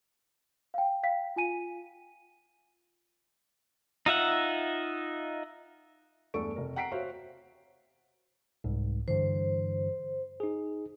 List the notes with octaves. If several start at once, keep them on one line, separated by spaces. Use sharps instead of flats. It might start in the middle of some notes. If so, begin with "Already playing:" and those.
F5 G5
F5 G5 B6
F4 G#5 D#7
D#4 F4 E5 F#5
E2 G2 A3 A4 C#6 D7
F1 A#4
F#5 G5 A#5 B6 C7 D7
F#4 C5 C#5 E5 F5
C2 G#2
G2 D3 E3 C5
D#4 G#4